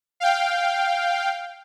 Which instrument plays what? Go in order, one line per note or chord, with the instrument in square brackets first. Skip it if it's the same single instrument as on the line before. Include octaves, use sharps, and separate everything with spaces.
[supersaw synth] F5 G5